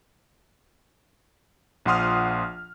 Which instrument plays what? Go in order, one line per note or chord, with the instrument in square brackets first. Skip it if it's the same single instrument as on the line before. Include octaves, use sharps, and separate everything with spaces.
[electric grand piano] A#1 F3 F#5 C6 D#6 F6